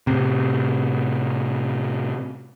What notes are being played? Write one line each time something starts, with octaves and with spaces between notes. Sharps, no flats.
A2 C3